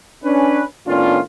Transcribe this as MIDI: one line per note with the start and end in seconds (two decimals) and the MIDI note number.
0.24 0.63 61
0.24 0.63 62
0.24 0.63 71
0.87 1.20 45
0.87 1.20 51
0.87 1.20 59
0.87 1.20 61
0.87 1.20 62
0.87 1.20 65